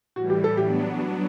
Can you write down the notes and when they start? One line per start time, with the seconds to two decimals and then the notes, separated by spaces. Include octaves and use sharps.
0.16 A2 E3 G3 F#4
0.30 G4
0.44 A4
0.57 F#3 B3 D4 G4
0.99 F#4